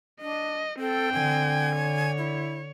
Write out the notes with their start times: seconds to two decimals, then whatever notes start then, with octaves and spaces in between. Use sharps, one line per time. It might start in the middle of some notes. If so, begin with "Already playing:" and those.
0.21 D4 D#5
0.79 C4 A4 G5
1.13 D3 G#5
1.77 C#5
2.18 E4